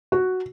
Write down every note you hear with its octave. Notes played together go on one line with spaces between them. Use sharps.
F#4